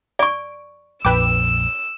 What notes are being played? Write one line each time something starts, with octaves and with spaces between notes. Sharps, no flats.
D5 C#6 D7
A#1 F2 A#2 B4 G5 D6 E6